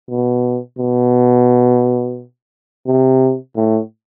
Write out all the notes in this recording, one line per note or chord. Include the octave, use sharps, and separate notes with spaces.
B2
B2
C3
A2